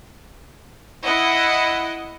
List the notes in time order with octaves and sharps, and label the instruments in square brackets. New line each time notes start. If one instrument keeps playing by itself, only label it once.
[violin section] E4 D#5 F#5